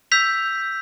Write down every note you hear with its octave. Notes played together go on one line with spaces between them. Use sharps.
E6 G6 B6 F7